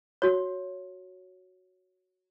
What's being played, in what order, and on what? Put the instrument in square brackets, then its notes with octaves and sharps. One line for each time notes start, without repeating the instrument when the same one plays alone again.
[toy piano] F#4 C#5